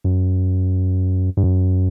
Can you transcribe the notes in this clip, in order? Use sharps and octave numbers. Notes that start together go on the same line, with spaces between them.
F#2
G2
F#2